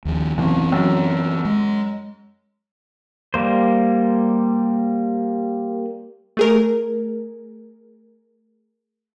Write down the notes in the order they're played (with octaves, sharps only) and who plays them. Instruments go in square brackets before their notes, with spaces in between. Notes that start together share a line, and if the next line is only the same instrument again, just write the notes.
[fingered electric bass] D#2 F3
[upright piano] F#1 [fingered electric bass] E3 B3 C4
[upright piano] F#2
[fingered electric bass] G#3
[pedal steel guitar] G3 A#3 C5
[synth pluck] A3 G#4 A#4